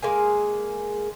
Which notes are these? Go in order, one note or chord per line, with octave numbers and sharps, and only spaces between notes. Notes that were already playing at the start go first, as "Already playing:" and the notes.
G#3 A#3 G#4